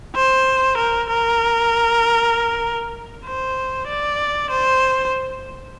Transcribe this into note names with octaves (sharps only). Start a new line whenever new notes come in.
C5
A#4
A#4
C5
D5
C5